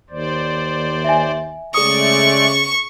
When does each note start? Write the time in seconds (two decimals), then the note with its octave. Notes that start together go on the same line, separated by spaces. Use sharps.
0.10 D#2 C5 D5
1.04 E5 G#5
1.74 C#3 G#3 A3 G#4 D5 C#6 D#6